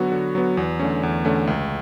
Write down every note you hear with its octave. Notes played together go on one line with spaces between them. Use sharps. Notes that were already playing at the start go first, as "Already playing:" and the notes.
Already playing: D3 F#3 B3 F#4
D3
F#3 B3 F#4
E2
D3 A3 C#4
E2
D3 A3 C#4
C#2